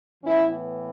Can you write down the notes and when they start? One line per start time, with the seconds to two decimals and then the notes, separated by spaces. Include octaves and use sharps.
0.23 A2 E3 B3 C#4 E4